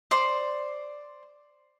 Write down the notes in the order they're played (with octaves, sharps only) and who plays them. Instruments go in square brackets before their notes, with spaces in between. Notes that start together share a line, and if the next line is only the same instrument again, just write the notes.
[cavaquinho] C5 D5 C6